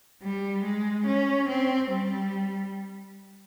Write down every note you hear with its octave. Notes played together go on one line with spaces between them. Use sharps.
G3
G#3
C#4
C4
G3